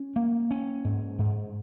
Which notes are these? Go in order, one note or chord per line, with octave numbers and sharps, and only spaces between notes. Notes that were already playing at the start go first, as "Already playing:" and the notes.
Already playing: C#4
A#3
C#4
G#2
G#2